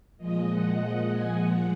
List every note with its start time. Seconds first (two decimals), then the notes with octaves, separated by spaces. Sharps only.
0.17 A#2 F3 G#3 D#5
0.48 F#5
0.80 F#5
1.11 G#5
1.43 A#2 F3 G#3 F#5